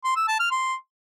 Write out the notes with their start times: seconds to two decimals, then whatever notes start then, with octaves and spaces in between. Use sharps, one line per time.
0.04 C6
0.16 E6
0.28 A5
0.39 F6
0.51 C6